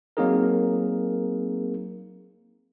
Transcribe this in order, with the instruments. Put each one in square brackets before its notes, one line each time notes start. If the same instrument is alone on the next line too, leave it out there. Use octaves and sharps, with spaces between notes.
[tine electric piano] F#3 A#3 C4 D#4 G#4 A#4